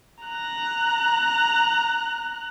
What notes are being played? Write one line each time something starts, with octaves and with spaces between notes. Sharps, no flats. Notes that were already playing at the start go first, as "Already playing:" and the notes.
A#5 F#6